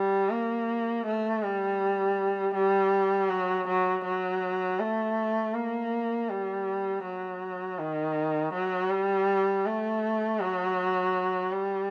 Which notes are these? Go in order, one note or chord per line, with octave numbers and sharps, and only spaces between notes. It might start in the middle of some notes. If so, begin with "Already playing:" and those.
Already playing: G3
A#3
A3
G3
G3
F#3
F#3
F#3
A3
A#3
G3
F#3
D#3
F#3
G3
A3
F#3
G3